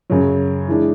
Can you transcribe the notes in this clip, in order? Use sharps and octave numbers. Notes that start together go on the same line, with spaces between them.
F#2 C#3 F#3
E3 G#3 D4